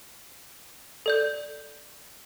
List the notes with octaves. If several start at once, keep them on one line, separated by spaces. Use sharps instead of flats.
A4 D5 G6